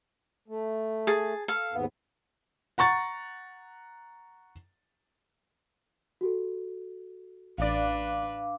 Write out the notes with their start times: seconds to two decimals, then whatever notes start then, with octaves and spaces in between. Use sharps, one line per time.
0.48 A3
1.07 G#4 A5
1.48 A4 F5
1.73 D#2 G#2 B3
2.78 F#5 A#5 C#6 A6
6.21 F#4 G4 A4
7.58 A1 D4 B4 D5 F5 D6